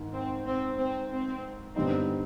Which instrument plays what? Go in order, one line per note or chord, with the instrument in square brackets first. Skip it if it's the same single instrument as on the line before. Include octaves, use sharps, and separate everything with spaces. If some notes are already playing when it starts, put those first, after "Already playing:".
Already playing: [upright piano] G#2 D#3
[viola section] C4
C4
C4
C4
[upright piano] G2 D3 G3 B3 D#4 [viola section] C4